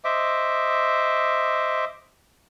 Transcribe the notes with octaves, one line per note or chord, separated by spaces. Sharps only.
C5 D#5 E5 D6